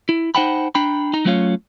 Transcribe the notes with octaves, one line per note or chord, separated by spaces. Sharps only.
E4
D#4 C5 F#5 G5 A5 B5
D4 G5 A#5 B5
D#4 A#5
F#3 A3 C#4 F4 C#5 F5